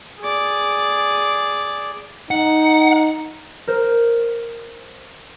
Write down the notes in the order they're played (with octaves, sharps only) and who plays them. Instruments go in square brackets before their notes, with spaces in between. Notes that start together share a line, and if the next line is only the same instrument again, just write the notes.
[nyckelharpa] G#4 D5
[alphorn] D#4 [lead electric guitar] F#5
[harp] A#4 C5